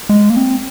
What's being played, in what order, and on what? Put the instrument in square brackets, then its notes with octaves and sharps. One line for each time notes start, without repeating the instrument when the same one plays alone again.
[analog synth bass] G#3
A#3
C4